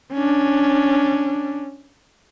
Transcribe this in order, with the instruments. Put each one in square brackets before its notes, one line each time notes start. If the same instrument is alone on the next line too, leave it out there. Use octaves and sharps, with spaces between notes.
[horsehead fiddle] C#4 D4